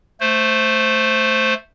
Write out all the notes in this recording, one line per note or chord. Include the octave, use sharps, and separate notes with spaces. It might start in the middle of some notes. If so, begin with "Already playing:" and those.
A3 C5